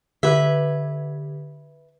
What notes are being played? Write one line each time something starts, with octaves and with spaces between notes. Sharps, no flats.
D3 G4 B4 E5 G#6